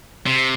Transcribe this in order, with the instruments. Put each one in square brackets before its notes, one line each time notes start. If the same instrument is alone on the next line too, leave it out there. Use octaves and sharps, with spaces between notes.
[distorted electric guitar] C3